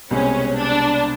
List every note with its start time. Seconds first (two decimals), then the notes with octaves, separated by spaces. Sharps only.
0.11 C2 B2 G#3 C4 C#4
0.58 D4